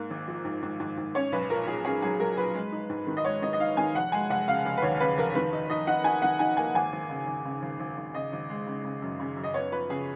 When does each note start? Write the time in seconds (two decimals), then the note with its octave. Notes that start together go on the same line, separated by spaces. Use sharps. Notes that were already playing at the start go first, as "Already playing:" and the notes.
Already playing: G#2 A#3
0.10 G#1
0.28 F3
0.45 G#2
0.63 G#2
0.80 G#2
0.98 G#2
1.15 C#4 C#5
1.32 B1 B4
1.50 A#2 A#4
1.67 A#2 G#4
1.85 C#4 G#4
2.02 F#3 G#4
2.19 F#3 A#4
2.37 A#2 B4
2.55 G#3
2.73 D#4
2.90 G#2
3.07 D#3
3.17 D#5
3.25 G#3 C#5
3.42 D#3 D#5
3.53 D#5
3.60 D#4 F5
3.77 D#3 G#5
3.95 F1 F#5
4.12 G#3 G#5
4.30 F1 F#5
4.48 C#3 F5
4.65 F1
4.77 B4
4.82 D#2 C#5
5.00 C#3 B4
5.17 F1 A#4
5.35 D#3 B4
5.53 D#4
5.70 D#4 D#5
5.87 D#4 F#5
6.04 D#4 G#5
6.22 D#3 F#5
6.39 D#4 G#5
6.57 A#3 G#5
6.75 G#1 G#5
6.92 G#1
7.10 C#3
7.27 G#1
7.45 C#3
7.62 G#1
7.80 G#1
7.97 G#1
8.15 C#3 D#5
8.33 G#1
8.49 G#3
8.67 C#3
8.84 C#3
9.02 F#2
9.20 C#3
9.36 F#2
9.44 D#5
9.54 B3 C#5
9.72 F3 B4
9.90 C#3 G#4